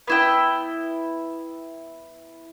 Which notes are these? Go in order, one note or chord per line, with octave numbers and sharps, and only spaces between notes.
B3 E4 G5